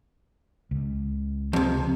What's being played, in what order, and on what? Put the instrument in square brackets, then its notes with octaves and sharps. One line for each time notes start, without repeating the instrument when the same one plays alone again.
[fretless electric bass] C#2
[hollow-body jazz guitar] F2 C3